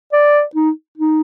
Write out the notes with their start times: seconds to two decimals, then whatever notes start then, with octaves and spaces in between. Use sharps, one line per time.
0.13 D5
0.55 D#4
0.98 D#4